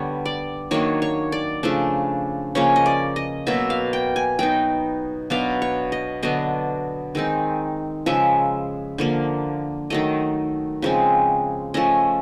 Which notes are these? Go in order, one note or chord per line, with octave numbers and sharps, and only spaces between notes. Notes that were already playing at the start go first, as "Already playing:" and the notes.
Already playing: D3 G3 B3 C#5
D5
D#3 F#3 A#3 D4 C#5
C#5
D5
C#3 F3 A3 D4
C#3 F3 A#3 C#4 C#5
D#5
D5
D#5
B2 F#3 A#3 E5
F5
G5
G#5
F#3 B3 D#4 G5
B2 F#3 B3 D4 F5
C#5
D#5
D3 F#3 B3 D4 D#5
D#3 G#3 C4 D#4
C#3 F3 G#3 E5
D3 F3 A#3
D#3 F#3 A3 D#5
C#3 F3 G#3 C4
F3 A3 C#4 D#5